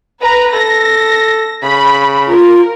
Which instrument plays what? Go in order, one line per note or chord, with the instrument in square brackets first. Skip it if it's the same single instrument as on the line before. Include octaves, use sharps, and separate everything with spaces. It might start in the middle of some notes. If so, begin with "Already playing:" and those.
[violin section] B4 A#5
[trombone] A4 [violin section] A#6
[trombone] C#3 [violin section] B5
[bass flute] F4 [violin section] A#4